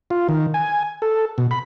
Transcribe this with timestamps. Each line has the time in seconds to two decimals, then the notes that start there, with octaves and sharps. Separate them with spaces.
0.10 F4
0.29 D#3
0.54 G#5
1.02 A4
1.38 B2
1.51 B5